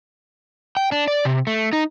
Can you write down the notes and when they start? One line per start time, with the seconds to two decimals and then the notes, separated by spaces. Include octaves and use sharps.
0.77 G5
0.92 D4
1.08 D5
1.25 C3
1.47 A3
1.73 D#4